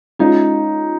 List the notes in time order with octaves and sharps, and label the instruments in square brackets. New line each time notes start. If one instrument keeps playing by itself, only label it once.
[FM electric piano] G#3 C#4 F4 [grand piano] D#4